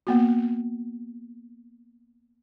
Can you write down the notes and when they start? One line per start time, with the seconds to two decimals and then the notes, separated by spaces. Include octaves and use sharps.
0.07 A#3 B3 F#4